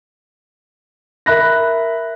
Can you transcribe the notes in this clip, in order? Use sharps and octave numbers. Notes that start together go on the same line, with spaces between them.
A#4 E5 B5 F#6 A#6